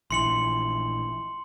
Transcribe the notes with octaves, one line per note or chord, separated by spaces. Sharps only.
A#1 E3 C6 C#7 F#7